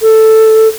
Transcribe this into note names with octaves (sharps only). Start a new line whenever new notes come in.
A4